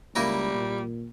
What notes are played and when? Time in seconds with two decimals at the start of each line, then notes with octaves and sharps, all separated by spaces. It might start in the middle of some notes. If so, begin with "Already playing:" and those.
0.16 C#2 G3 A#3 E4 A#4
0.54 A#2